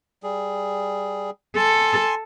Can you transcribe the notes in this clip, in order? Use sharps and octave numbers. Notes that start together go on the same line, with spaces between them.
G3 G#4
A4 G#5 C6